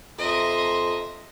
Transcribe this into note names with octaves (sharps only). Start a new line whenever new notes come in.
F2 D#5 E5 A#5 C6